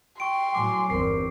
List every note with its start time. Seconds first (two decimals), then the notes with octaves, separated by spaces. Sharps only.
0.20 G5 C6 C#6 D7
0.55 A2 F#3 G#5 D6
0.90 G1 E2 C4 A#4 C7